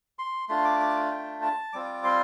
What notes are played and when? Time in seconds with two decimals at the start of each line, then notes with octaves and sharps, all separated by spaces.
0.19 C6
0.49 A3 D4 F4 C6
0.65 D6
0.80 D6
1.11 G5
1.42 A5
1.73 G3 C4 F4 D6
2.04 C6